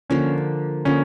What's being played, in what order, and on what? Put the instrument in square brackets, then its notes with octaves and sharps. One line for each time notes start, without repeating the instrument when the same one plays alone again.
[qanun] D3 F3 A#3 [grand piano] C#4
[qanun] D3 F3 A#3 [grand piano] C#4